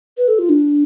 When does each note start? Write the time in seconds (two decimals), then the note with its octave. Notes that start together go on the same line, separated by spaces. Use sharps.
0.18 B4
0.28 A4
0.39 F4
0.49 D4